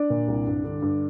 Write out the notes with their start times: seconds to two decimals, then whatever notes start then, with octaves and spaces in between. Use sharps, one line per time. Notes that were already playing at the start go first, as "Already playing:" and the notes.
Already playing: D4 D5
0.10 A#2
0.28 C2
0.47 G2
0.64 D3
0.82 G2